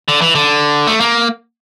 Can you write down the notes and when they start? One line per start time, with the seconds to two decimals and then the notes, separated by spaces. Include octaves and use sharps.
0.08 D3
0.22 E3
0.35 D3
0.87 A3
1.00 A#3